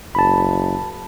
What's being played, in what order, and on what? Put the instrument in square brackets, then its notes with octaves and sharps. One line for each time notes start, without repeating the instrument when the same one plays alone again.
[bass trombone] F#1 [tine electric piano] A5 B5